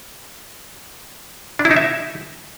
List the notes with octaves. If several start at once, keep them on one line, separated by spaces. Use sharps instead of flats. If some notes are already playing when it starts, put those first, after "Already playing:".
D4
E4
D#4
E5